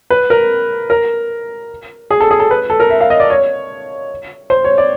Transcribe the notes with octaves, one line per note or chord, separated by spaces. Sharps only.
B4
A#4
A#4
G#4
A4
G#4
A4
B4
A4
A#4
E5
F5
D#5
D5
C#5
C5
C#5
D5